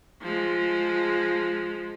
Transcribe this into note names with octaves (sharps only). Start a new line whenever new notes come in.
F3 G#3